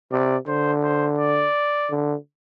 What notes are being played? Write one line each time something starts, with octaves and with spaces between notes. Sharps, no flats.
C3 D5
D3 C5
C5
D5
D3